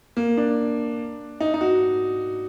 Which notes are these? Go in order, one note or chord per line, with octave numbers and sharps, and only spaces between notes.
A#3
D4
D#4
D#4
F#4